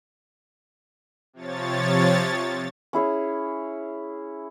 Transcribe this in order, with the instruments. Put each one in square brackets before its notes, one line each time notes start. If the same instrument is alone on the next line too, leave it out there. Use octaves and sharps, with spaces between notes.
[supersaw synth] C3 F3 C#5 A6
[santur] C#4 E4 G#4 C#5